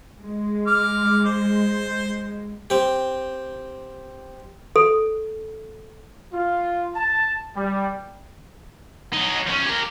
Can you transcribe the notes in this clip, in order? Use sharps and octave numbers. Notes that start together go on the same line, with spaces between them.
G#3
D6 F6
C5
C4 G4
A4
F4
A5
G3
F#3 D#4
F3 C#4
G4 A#4